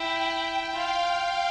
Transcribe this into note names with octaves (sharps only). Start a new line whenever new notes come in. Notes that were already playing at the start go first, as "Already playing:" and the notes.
Already playing: E4 G5
F4 F5